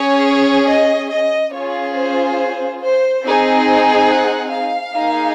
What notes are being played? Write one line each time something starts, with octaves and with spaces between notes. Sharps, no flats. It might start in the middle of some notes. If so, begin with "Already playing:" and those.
Already playing: C#4 G#4 C#5
D#5
D#5
C#4 F4 G#4 C#5
C5
C5
C4 D#4 G#4
F#5
F5
A#3 D#4 G#4